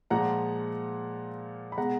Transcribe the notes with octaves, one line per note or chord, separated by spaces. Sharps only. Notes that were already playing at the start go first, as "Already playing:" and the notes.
A#2 F3 G#3 F#5 A#5
B5
B2 G#3 F#5 A#5